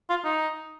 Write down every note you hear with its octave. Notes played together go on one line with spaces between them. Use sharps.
F4
D#4